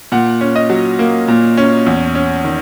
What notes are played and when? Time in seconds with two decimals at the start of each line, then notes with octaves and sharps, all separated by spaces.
0.12 A#2 F#5
0.41 C#4
0.56 D#5
0.70 F#3
0.99 A#3
1.28 A#2
1.57 C#4
1.86 E2
2.15 C#4
2.44 D#3